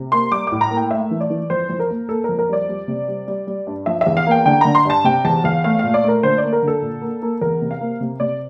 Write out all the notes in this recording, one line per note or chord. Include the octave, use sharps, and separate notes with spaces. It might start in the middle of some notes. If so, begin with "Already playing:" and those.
Already playing: C3
A#3 C6
G3 D6
A2 D6
A#5
A#3
G5
A3 E5
E3
D5
E3
F2 C5
F2
A#4
A#3
A#3 A4
F2 A#4
A#4
G3 D5
G3
C3
G3
G3
G3
G2
F3 E5
E5
E2
F5
A#3 G5
D3 G5
D3 A#5
C6
G2 A5
C3 G5
E2 A5
E2 F5
A3 F5
A#2 F5
D5
A3 A#4
D3 C5
A#3 D5
A#4
D3
A4
A#2
A#3
A#3
E2 A#4
C3
F5
A#3
C3
C3 D5